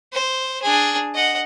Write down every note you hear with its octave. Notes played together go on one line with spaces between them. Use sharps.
C5
D4 G#4
D#5 F#5